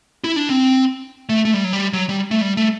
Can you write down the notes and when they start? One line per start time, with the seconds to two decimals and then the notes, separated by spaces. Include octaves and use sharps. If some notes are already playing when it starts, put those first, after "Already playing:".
0.24 E4
0.36 D4
0.50 C4
1.29 A3
1.45 A3
1.54 G3
1.64 F#3
1.73 G3
1.93 F#3
2.09 G3
2.31 A3
2.41 G3
2.57 A3